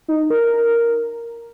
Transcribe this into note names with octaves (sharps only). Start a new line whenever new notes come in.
D#4
A#4